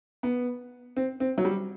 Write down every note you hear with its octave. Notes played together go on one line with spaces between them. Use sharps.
B3
C4
C4
F#3
G3